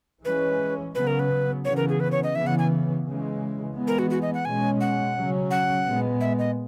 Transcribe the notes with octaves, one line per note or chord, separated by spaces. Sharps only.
E3 G#3 C#4 B4
C#3 F#3 B3 B4
A#4
B4
C#3 E3 B3 C#5
A#4
G#4
B4
C#5
D#5
C#3 E3 B3 E5
F#5
G#5
C#3 E3 G#3
E3 G#3 B3
A#4
F#4
F#4
D#5
F#5
B2 G#3 C#4 G#5
F#5
C#3 F#3 C#4
F#5
A#2 G#3 B3
E5
D#5